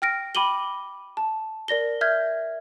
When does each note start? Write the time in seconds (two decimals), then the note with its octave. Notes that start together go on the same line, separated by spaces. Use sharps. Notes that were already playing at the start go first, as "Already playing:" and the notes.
0.02 G5 F6 A#6 D7
0.35 G5 B5 D6 D#7 F#7 G7
1.17 A5
1.68 A#4 D5 A#6 G7
2.01 E5 F6 G6 G#6